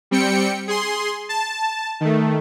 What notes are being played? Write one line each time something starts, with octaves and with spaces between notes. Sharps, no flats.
G3 C4 G5 C#7
G#4 C6
A5
D#3 A3